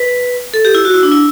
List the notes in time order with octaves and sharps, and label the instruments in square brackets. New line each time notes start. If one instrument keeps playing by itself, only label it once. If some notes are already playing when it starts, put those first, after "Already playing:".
Already playing: [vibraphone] B4
A4
G4
E4
F#4
E4
D4
E4